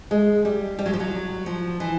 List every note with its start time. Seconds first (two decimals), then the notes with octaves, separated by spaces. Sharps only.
0.11 G#3
0.45 G3
0.79 G3
0.86 F#3
0.93 F3
1.00 F#3
1.46 F3
1.80 E3